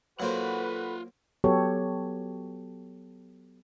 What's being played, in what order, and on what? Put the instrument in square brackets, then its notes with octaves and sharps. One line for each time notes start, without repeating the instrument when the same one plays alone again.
[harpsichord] F#3 A#3 C5 [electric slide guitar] F4 F#5 [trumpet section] F#4 B4 [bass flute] A4
[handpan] F#3 B3 G4 A4 C#5